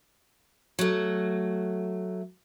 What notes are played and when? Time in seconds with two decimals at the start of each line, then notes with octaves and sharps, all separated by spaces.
0.79 F#3 A3